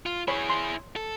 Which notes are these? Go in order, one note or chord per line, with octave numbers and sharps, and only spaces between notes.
F4
E4 G#4 C#5 B5
C6
A4